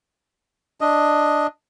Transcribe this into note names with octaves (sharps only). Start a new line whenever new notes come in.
D4 D#5